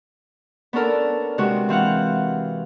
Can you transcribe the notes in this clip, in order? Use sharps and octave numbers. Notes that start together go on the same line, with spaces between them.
B3 C#4 D4 A4 A#4
C3 G#3 F#4
E3 C4 F5 F#5